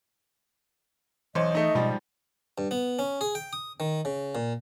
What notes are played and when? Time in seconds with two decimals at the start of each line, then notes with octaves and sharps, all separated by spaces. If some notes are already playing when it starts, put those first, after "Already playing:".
1.35 B1 E3 C5 D#5
1.55 A3 D#4
1.75 G#2 B2 F3 G3
2.58 G2
2.71 B3
2.99 C#4
3.21 G#4
3.35 G5
3.53 D#6
3.80 D#3
4.05 C#3
4.35 A#2